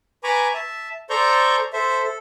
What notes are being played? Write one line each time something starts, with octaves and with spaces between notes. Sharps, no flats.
B4 G#5 A#5 B5 C#6 D6
E5 A5
A4 C5 D5 A#5 C#6 G6
A4 C5 E5
A4